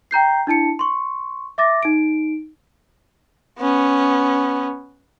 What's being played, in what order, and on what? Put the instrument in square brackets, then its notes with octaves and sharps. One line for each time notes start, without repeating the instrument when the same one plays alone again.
[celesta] G5 A#5 G6 C7
D4 E4 A5 C#7
C6 C#6
E5 D6 A6 A#6
D#4 D7
[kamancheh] B3 C#4